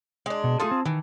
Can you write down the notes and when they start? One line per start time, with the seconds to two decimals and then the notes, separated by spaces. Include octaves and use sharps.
0.26 G#3 D4
0.44 B2
0.60 A3 D#4 F4 G#4 A4 A5
0.71 C4
0.85 D#3 E3